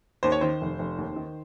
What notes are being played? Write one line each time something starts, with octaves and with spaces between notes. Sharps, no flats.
D#2 C5
C#5
D#3 C5
F1
F1
D#2
D#3